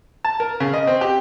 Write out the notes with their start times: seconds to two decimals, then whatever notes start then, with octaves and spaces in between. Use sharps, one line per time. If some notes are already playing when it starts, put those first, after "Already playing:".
0.25 A5
0.40 A#4
0.60 C#3
0.74 D#5
0.87 C4
1.01 G4